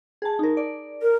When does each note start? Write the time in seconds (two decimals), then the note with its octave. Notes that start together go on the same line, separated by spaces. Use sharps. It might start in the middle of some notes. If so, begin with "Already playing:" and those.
0.22 G#4 A5
0.39 D#4 A#4
0.57 D5
1.02 A#4